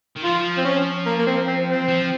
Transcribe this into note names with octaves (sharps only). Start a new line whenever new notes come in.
D#3
F3 F4
C4
C#4
A#3
A#3
C4
C4
C4
F3